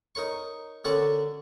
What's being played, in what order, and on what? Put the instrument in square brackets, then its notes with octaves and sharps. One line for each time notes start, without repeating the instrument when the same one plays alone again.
[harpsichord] D#4 A#4 C#5 C#6
D3 C#4 F#4 A#4 C#5 D5